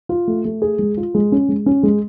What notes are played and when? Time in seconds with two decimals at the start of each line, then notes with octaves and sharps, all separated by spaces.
0.09 F4
0.28 A3
0.45 A3
0.62 G#4
0.79 G#3
0.97 F4
1.15 G#3
1.32 C#4
1.49 G#3
1.66 C#4
1.83 G#3